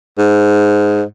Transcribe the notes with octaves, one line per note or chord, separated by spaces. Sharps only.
G#2